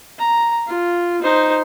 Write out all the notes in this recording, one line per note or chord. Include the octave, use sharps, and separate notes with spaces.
A#5
F4
D#4 C5